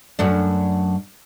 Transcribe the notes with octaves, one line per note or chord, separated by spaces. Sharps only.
F#2 A3 D4